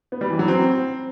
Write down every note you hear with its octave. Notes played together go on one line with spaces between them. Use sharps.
B3
G3
E3
F#3
C4